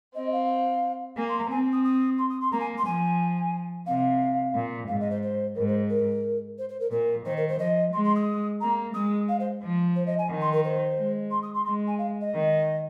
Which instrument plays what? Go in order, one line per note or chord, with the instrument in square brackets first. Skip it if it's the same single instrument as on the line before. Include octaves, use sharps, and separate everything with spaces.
[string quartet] C4 [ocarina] D#5
[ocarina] F5
[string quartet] A#3 [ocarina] G#5
[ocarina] C6
A#5
[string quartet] C4 [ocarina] G#5
[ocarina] D#6
D#6
C6
D#6
C6
[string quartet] A#3 [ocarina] A#5
[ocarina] G#5
C6
[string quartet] F3 [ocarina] G#5
[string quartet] C3 [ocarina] F5
[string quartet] A#2
[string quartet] G#2 [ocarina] F5
[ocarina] D#5
C5
C5
[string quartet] G#2 [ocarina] A#4
[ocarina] C5
A#4
C5
C5
A#4
[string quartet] A#2 [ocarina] A#4
[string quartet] D#3 [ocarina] C5
[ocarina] A#4
C5
[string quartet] F3 [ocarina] D#5
[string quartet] G#3 [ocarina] C6
[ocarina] C6
D#6
[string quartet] A#3 [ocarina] A#5
[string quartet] G#3 [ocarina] D#6
[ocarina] F5
C5
[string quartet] F3
[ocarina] C5
D#5
G#5
[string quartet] D#3
[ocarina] C6
A#4
C5
[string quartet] G#3
[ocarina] C6
D#6
C6
[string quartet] G#3 [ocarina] C6
[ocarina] G#5
F5
D#5
[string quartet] D#3